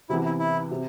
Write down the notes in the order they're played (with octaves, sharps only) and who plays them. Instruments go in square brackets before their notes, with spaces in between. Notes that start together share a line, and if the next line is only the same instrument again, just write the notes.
[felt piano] C3 E3 B3 [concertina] E4
[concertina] E4
E4
[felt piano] C3